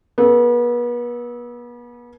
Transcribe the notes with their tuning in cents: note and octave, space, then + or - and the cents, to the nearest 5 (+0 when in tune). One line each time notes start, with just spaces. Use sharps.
B3 -40 A4 -30